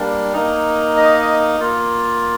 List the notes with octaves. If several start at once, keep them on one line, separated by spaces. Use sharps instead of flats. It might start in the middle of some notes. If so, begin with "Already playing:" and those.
Already playing: G3 A#3 D4
A#3 D#4
D#5
A#3 F4